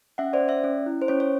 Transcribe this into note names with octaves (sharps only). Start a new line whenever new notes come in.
C#4 E5 F#5
C5 D5
C#4
D5 E5
C#4
E4
C5
C#4 C#5
C#5